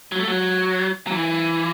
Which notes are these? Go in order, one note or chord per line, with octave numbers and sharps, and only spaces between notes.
F#3
A3
F#3
F#3
E3